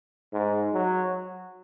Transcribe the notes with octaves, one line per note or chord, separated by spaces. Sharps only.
G#2
F#3